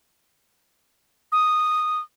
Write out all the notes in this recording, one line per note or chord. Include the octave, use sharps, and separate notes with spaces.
D#6